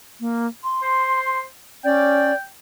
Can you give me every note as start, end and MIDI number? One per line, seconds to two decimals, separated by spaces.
0.20 0.46 58
0.64 1.41 84
0.82 1.44 72
1.84 2.32 61
1.84 2.34 74
1.84 2.43 79